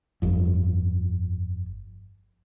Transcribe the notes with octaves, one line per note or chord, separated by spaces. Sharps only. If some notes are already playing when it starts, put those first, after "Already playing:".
G1 F2